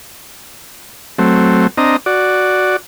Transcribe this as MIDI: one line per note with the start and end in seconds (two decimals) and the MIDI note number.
1.19 1.67 54
1.19 1.67 57
1.19 1.67 60
1.77 1.96 60
1.77 1.96 62
1.77 1.96 75
1.77 1.96 82
2.06 2.76 66
2.06 2.76 74